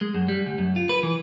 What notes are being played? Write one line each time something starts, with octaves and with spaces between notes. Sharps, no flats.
G#3
F#2
G3
D2
F#2
F4
B4
E3